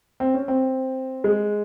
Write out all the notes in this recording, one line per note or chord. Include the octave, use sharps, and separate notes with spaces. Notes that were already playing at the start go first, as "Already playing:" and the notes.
C4
C#4
C4
G#3